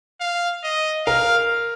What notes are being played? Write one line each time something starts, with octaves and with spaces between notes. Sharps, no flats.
F5
D#5
A#4 F5